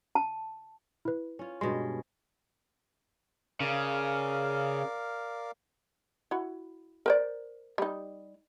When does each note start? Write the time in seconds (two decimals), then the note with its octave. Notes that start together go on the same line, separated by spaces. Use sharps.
0.15 A5
1.05 E4 B4
1.39 C#4 F4
1.61 G2 B2 G#3 C6
3.60 C#3 A#4 D5 F5
6.31 E4 F#4
7.06 A#4 C5 D5
7.78 G3 D#4